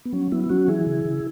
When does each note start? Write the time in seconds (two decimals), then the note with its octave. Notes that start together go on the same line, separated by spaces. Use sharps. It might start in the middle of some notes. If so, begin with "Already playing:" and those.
0.05 B3
0.13 F#3 C#4
0.32 F#3 B3 E4
0.44 E4
0.50 F#3 C#4 F#4
0.68 E3 E4 G#4
0.86 C#3
1.05 C#3